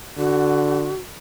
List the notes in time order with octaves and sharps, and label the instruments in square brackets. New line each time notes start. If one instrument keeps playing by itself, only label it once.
[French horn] D3 [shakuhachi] F#4